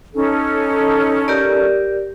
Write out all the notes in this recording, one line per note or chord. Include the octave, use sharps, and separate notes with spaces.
C#4 D#4 A4
G4 A#4 D5